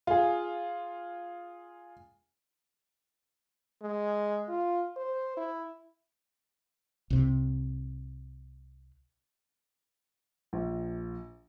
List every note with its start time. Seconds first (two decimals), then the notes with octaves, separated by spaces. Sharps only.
0.07 F4 G#4
3.82 G#3
4.49 F4
4.96 C5
5.37 E4
7.10 C2 C3
10.53 A#1